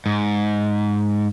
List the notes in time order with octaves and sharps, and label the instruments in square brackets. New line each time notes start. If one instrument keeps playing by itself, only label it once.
[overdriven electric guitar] G#2